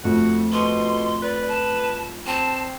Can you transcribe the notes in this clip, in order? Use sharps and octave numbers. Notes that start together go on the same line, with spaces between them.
F2 A3 F#4
B2 C6
B4 D5
A5
C4 A5